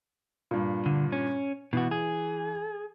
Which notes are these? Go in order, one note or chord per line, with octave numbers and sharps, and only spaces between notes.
G2 A#2
D3
C#4
B2 E3 F#4
G#4